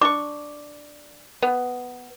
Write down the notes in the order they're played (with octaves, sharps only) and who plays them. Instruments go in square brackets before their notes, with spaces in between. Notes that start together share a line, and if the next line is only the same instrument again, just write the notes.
[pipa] D4 C#6 [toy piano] D6
[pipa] B3